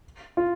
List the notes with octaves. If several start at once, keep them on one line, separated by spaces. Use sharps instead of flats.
F4